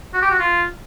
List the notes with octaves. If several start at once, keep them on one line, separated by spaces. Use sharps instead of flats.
F#4
G4
F#4
F4